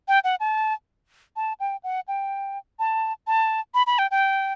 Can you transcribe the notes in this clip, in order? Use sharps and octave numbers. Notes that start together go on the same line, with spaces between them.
G5
F#5
A5
A5
G5
F#5
G5
A5
A5
B5
B5
G5
G5